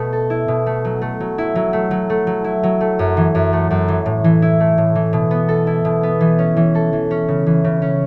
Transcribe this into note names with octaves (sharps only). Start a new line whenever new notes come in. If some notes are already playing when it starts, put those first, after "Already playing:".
Already playing: B2 A3
A4
E4
B2
A3
F#3
A3
F#3
E4
F#3
A3
F#3
A3
F#3
E4
F#3
A3
F#2
E3
F#2
A3
F#2
E3
A2
E3
E4
A3
A2
E3
B2
B3
A4
E4
B2
B3
E3
C#4
E3
A4
E3
C#4
C#3
E3
C#3
C#4